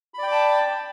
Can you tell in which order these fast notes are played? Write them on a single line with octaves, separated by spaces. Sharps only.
B5 D5 G5 D6 A5